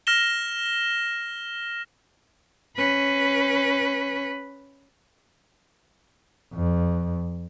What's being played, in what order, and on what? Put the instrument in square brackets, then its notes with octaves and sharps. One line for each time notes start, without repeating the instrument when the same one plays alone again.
[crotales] F6 A#6 E7 G7
[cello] C#4 B4
[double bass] F2